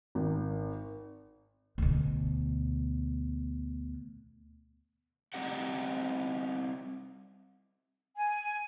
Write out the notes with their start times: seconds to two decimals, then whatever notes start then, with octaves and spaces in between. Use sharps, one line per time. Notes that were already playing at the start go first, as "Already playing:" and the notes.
0.15 G#1
1.78 D2 B2
5.34 G3 C4 D#4 G4 F#5
8.16 G#5